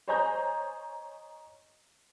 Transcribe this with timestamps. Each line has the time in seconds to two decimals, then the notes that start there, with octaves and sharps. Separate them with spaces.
0.08 C5 C#5 D#5 G#5 A#5 G6